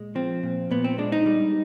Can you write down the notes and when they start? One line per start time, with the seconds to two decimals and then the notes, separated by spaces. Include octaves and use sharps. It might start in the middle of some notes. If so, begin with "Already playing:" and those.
Already playing: A#2 G#3
0.15 F3 C4
0.43 A#2
0.71 A#2 B3
0.84 C4
0.98 G#3 D4
1.12 D#4
1.26 G3